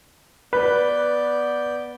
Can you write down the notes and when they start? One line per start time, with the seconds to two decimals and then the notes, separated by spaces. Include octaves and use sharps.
0.53 B3 B4 D5 G6